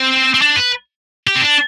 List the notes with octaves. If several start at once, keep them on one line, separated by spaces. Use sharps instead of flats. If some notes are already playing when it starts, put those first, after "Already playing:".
Already playing: C4
C4
D4
B4
G4
C4
D4